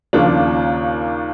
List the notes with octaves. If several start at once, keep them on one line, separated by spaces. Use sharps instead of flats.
D#2 C#3 F3 A#3 D4